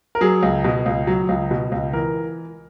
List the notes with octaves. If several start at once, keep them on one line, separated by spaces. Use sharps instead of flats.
A#4
F#3 G#4
C#2
B2
C#2
F#3
C#2
B2
C#2
E3 A#4